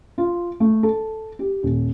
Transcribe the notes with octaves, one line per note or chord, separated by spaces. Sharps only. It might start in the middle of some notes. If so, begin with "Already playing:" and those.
F4
A3
A4
G4
D#1